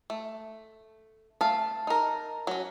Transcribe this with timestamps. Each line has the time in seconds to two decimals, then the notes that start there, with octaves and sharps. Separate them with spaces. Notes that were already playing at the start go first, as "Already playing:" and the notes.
0.10 A3
1.41 A3 F5 A5
1.87 D#4 A#4
2.47 F#3 C#4